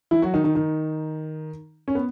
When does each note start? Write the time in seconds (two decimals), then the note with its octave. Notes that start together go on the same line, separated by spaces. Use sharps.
0.11 E3 E4
0.22 F#3 F#4
0.34 D#3 D#4
0.44 D#3 D#4
0.55 D#3 D#4
1.88 C#4
1.95 B3